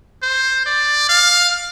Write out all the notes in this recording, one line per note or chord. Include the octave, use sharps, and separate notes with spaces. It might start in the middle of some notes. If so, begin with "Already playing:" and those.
C5
D5
F5